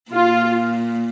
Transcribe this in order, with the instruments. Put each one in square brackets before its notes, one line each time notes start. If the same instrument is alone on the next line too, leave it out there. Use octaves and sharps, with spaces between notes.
[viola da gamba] A#2 [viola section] F4